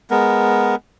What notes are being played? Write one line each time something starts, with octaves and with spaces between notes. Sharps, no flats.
G#3 B3 A#4